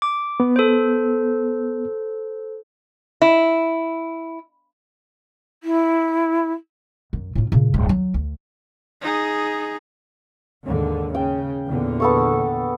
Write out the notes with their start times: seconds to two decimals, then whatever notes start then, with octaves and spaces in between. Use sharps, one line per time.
0.02 D6
0.40 B3
0.56 A4 C5
3.22 E4
5.62 E4
7.13 F#2
7.35 A2 F4
7.52 A#2 C#3
7.74 D1 G2
7.89 F#3
8.14 D2
9.02 D#4 G#4
10.65 D#2 G#2 D3
11.15 C#3 G5
11.66 E2 A#2 D3
12.00 B3 A4 C#6